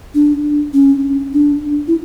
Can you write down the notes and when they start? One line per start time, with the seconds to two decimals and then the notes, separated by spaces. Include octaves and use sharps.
0.15 D4
0.74 C#4
1.33 D4
1.88 E4